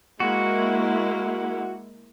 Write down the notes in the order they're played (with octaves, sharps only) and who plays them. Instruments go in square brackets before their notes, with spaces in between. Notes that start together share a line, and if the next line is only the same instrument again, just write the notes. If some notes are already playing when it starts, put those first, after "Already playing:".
[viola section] G#3 A#3 E4 [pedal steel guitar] F#4